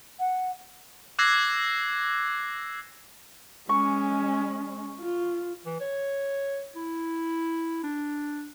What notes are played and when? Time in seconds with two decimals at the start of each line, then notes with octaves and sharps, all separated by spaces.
0.19 F#5
1.19 D6 E6 F#6 G#6 A#6 C7
3.69 G#3 C#4 C#6
5.00 F4
5.66 E3
5.81 C#5
6.76 E4
7.84 D4